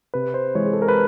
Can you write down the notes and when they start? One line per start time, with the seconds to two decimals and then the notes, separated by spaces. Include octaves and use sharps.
0.14 C3 B4
0.34 C5
0.55 E3 G#3 C#5
0.66 G#4
0.73 A4
0.82 A#4
0.88 B4